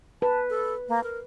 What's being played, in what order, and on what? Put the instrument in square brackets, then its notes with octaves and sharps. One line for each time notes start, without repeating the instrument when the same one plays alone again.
[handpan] B4 [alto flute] A5
[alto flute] A4
A#3
A#4